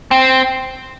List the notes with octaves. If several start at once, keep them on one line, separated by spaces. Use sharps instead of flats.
C4